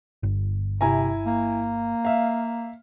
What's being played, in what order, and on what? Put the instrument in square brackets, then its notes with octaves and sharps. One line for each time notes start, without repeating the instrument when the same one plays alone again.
[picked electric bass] G1
[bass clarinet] C3 [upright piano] E4 G#5 A#5
[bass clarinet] A#3
[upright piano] E5 F5